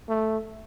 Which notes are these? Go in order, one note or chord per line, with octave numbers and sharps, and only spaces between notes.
A3